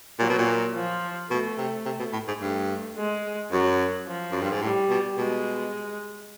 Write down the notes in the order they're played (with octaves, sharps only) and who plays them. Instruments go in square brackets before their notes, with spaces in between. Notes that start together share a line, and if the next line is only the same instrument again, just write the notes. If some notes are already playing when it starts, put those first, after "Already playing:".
[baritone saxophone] A#2 [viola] F#3
[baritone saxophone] B2
A#2
[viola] F3
[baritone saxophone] B2 [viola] A3
[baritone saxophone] C3
C3
B2
A2
G#2
[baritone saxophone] G2 [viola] A3
[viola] G#3
[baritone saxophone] F#2 [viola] F#3
[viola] F3
[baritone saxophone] F#2
G2
G#2
[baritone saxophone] A2 [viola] G3
[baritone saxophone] B2
[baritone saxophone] B2 [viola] G#3